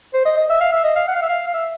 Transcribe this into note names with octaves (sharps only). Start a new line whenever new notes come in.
C5
D#5
D#5
E5
F5
E5
D#5
F5
F#5
F5
E5
F5
F5
E5